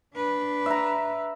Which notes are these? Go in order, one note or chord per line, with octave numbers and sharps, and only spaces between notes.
D4 B4
E5 A#5